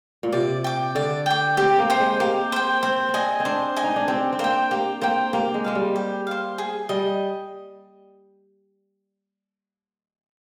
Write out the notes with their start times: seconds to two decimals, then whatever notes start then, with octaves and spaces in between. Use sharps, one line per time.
0.23 A#2
0.32 C3 D5
0.64 G5 D6
0.95 D3 D5
1.26 G5 D6
1.57 C4 G4
1.79 A#3
1.90 C5 G5
2.00 G#3
2.20 A#3 G4
2.52 C5 G5
2.83 C4 C5
3.09 C4
3.14 D4 D#5 G#5
3.40 C4
3.45 D4 C5
3.76 D#5 G#5
3.84 D#4
3.96 D4
4.08 C4 G4
4.33 C4
4.39 A#3 C5 G5
4.71 A#3 G4
5.01 A#3 C5 G5
5.33 A#3 G4
5.54 G#3
5.64 G#3 C5 F5
5.75 G3
5.96 G4
6.27 C5 F5
6.58 G#4
6.89 G3 D#5